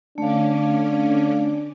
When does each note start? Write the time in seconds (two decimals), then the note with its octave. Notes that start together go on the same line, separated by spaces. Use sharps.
0.18 D3 A3 C#4 D4 F5 D6